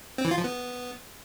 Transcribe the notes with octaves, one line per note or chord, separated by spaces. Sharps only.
C4
E3
F4
F3
B3